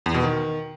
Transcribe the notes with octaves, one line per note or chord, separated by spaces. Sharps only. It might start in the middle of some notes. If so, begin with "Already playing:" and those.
E2
B2
D#3